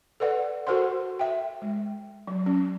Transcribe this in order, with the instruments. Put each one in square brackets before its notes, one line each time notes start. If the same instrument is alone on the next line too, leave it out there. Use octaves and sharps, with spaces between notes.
[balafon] A4 B4 D5 F#5
F#4 A4 A#4 C5 F#5 C6
E5 G5
G#3
F#3
C#4